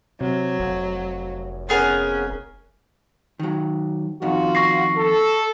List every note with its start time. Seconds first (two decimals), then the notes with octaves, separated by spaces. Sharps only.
0.21 C3 F#3
0.60 F1
1.69 B3 C#4 G#4 A#4
3.39 D#3 F#3
4.22 F2 D#3 F4 F#4
4.55 C#6 A#6 C7
4.96 A4